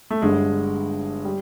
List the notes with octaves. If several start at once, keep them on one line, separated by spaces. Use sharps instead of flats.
A3
G1 G2 D3 G#3
G3